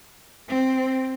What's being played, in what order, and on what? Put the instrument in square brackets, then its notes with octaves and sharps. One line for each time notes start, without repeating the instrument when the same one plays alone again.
[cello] C4